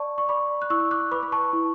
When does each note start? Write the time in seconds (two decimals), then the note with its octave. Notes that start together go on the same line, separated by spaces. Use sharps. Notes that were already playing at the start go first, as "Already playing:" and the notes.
Already playing: D5 A5 C#6
0.18 C#6
0.29 D5 B5 D6
0.62 F#6
0.70 E4 C#6 E6
0.91 D6 F#6
1.11 B4 B5 D6
1.23 B5
1.32 A5 C#6
1.53 E4